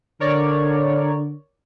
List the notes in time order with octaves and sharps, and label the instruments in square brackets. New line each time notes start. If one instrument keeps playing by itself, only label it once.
[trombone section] D3 [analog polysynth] A#4 C#5 D5